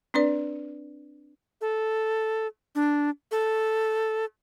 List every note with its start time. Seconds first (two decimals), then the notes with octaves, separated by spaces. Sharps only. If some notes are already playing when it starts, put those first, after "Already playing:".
0.14 C4 D4 B4 D5
1.61 A4
2.75 D4
3.31 A4